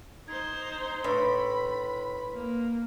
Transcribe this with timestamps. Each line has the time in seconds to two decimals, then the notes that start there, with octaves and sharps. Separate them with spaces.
0.28 D#4 C5 G#6
1.04 A2 D4 B4 B5 C6
2.33 A#3